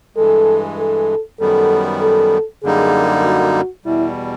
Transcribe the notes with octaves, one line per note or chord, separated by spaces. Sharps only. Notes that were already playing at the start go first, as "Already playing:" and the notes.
G2 E3 G#3 A4
A4
F#2 D#3 G3 B3 A4
A4
F#2 D3 G3 A#3 D#4 G#4
F#4
E2 B2 G3 E4